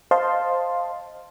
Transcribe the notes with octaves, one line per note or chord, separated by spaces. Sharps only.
C5 D#5 F5 A5 C6